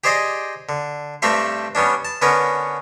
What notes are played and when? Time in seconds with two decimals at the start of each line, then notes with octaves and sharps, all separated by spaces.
0.04 G4 G#4 C5 D5 D#5
0.69 D3
1.22 G2 A3 C4 G4 E5 C6
1.75 G3 B3 C#4 D4
2.05 A5
2.22 D3 B3 C#4 A#4 B4